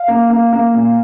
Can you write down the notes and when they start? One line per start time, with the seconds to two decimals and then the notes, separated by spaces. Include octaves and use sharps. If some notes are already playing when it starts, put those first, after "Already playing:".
Already playing: F5
0.08 A#3
0.30 A#3
0.53 A#3
0.74 A#2